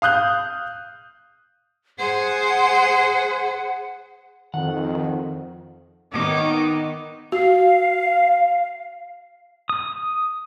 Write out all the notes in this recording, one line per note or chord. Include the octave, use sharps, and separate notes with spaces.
F5 D#6 F#6 G6
G#4 C5 F#5
F2 D#3 F#5
D#3 B3 D#4 C#5 D#5 D6
F#4 F5
D#6